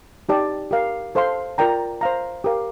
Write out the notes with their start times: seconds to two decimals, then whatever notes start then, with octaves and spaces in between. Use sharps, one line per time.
0.29 D#4 G4 D5 A5
0.71 G4 A#4 F5
1.15 A4 C5 F5 A5 C6
1.58 F4 A#4 D5 G5 A#5
2.01 C5 F5 A#5
2.44 G4 A#4 F5